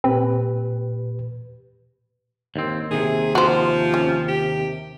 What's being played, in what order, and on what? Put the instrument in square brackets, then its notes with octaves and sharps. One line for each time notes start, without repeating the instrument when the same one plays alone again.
[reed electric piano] A#2 G4 B4 [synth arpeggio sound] C4
[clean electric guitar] D#2 C4
[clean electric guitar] D#2 A2 C3 [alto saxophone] G#4
[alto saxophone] F3 [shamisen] F#4 C5
[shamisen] C#4
[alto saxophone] G4